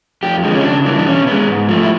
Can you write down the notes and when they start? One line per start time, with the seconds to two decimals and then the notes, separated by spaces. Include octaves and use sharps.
0.23 F2 G4
0.44 D3 F3 G#3
0.55 C#4
0.64 C#3 D4
0.85 E3 G3 A#3
0.98 D4
1.06 B2 C#4
1.27 G#3 B3
1.48 G#2
1.69 F3 A3
1.83 E4